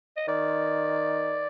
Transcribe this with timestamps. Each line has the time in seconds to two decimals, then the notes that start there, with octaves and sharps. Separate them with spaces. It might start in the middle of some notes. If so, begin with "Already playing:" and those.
0.17 D#5
0.28 D#3 D5